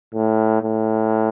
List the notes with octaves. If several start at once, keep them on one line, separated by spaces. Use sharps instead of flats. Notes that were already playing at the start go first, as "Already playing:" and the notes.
A2
A2